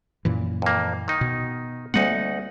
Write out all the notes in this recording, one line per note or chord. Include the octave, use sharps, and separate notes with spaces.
F#2 A#2 E3
F2 A#3
D#3 D#4
B2
D2 G3 A#3 C4 D#4 F#5